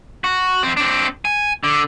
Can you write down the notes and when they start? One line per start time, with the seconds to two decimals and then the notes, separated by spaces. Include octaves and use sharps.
0.24 F#4
0.63 F2 C4
0.77 C4 D4
1.25 G#5
1.64 D3